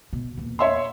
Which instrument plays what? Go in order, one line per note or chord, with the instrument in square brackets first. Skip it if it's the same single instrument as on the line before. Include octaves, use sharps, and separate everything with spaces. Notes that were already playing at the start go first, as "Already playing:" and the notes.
[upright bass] B2
E2 A#2
[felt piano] C#5 E5 C6